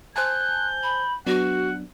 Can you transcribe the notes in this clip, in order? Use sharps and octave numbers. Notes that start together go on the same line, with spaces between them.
C5 G#5 A5 F#6 G6
B5
F#3 B3 D4 F#4 F#5